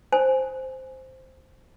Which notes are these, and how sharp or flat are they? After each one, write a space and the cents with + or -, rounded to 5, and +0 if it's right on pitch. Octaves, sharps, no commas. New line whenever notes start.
C5 +0 G#5 +0